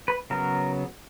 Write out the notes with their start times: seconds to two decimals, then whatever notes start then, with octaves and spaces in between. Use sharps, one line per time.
0.08 B4
0.30 C#3 F#3 B3 A#4